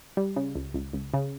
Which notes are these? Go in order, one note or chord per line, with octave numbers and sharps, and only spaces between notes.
G3
C#3
C#2
C#2
C#2
C#3